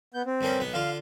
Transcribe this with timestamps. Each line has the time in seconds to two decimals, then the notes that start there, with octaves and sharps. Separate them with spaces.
0.14 B3 G6
0.26 C4
0.41 G2 A#3 C#4
0.59 B1 B3
0.73 D3 F4 F5